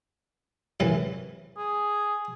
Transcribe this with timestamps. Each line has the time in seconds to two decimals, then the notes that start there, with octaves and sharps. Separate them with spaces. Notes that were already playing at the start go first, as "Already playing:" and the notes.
0.80 F#2 C3 E3
1.57 G#4